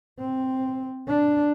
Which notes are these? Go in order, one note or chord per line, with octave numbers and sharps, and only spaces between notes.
C4
D4